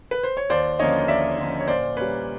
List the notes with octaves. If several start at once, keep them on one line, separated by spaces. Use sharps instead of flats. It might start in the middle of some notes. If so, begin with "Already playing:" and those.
B4
C5
C#5
D#2 C5 D5
D3 F3 A#3 C#4 C#5 D#5
D#2 D5 E5
D3 F3 A#3 C#4
C#5
A#2 C5 D5
G3 A#3 C#4 B4 C#5